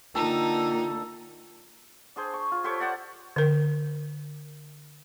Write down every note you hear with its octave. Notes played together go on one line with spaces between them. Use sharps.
D3 A#3 D#4 F4 A4 G5
D4 G#4 C5
C#6
F4
G4 A4 C5 C#5
D5 F#5 A5
D3 A#4